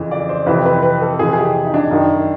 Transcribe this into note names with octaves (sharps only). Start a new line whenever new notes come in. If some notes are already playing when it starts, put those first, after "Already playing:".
Already playing: F2 C#3 E3
D5
C5
F2 C3 E3 B4
B4
B4
A4
F2 C3 E3 G#4
G#4
G4
D#4
D4
F#2 D#3